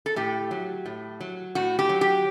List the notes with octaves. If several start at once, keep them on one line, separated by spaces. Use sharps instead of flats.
A4
A2 G4
F#3
A2
F#3
A2 F#4
G4
F#3
G4